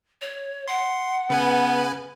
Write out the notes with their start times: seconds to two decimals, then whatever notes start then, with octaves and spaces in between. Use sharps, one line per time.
0.21 C#5
0.68 F#5 C6
1.30 C#3 B3 B4 G#5